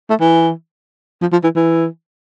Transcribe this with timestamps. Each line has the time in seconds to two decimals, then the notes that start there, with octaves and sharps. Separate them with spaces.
0.10 A3
0.20 E3
1.22 F3
1.32 F3
1.44 E3
1.56 E3